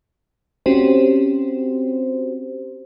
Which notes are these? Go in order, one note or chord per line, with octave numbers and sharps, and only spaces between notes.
C4 C#4 F#4 G4 C5